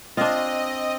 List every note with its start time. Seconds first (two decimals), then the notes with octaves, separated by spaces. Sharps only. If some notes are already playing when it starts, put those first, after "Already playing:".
0.17 C4 D4 F4 D#5